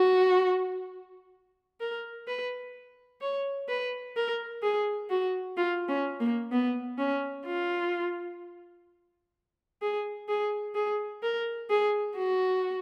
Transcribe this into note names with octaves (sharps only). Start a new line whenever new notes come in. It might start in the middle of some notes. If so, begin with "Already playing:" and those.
Already playing: F#4
A#4
B4
C#5
B4
A#4
G#4
F#4
F4
C#4
A#3
B3
C#4
F4
G#4
G#4
G#4
A#4
G#4
F#4